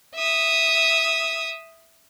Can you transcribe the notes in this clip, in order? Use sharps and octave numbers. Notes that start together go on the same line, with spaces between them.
E5 D#6